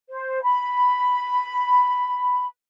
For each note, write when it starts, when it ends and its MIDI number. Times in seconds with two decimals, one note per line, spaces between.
0.10 0.42 72
0.43 2.46 83